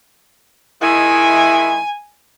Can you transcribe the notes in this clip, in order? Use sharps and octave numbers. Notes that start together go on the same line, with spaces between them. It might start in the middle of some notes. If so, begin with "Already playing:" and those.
D#3 G#3 E4 G#5